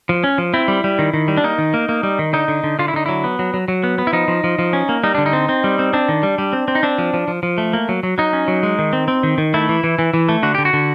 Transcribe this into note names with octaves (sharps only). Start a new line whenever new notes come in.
F3
C#4
F3
C4 E4
G3
G3
D#3
D#3
G3
D4
A#3 D#4
D#3
A#3
A#3
G3
D#3
D3 D#4
D3
D3
D3 F4
E4
D3 D#4
F#3 E4
B3
F#3
F#3
F#3
B3
B3
E4
F3 D#4
F3
F3
F3
C#4
A#3
G3 D#4
D3 D4
D#4
C4
C4
G3
C4
C4 D4
D#3
G3
G3
C4
C4
D#4
C4 D4
F3
F3
F3
F3
A3
A#3
F#3
F#3
F#3 D#4
C#4
F#3
G#3
D#3
C4
C4
D#3
D#3
A3 E4
E3
E3
E3
E3
A3
D3 F#4
D3 G4
F#4
D3